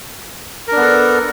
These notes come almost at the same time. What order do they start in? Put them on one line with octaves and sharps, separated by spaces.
A#4 D4 B3 A4